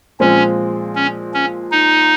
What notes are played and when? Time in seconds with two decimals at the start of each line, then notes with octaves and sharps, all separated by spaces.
0.20 A#2 F3 G#3 C4 C#4 F4
0.95 C#4
1.34 C#4
1.71 D#4